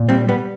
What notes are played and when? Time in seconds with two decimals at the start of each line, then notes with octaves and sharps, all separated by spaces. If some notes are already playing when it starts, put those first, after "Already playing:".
Already playing: A#2
0.09 G3 C4
0.28 G3 B3